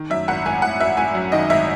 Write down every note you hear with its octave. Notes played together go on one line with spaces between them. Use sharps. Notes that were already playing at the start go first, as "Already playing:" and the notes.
Already playing: D#3
F#2 E5
G#1 F#5
G#1 G#5
G#1 F#5
G#1 E5
G#1 G#5
F#2
D#3 D#5
G#1 E5